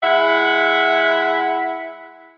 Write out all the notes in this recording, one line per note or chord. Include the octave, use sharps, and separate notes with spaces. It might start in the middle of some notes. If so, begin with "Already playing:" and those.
G#3 E4 E5 F#5